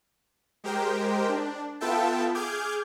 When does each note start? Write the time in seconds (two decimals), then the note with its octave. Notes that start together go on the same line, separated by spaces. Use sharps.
0.64 G#3 G4 A#4 C5 G5
1.29 D4
1.81 B3 F4 A4 E5 G5 A5
2.34 G#4 D6 F6 G6 G#6